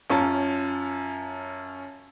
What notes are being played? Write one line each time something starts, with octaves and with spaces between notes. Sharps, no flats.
F#2 C#4 F4 A5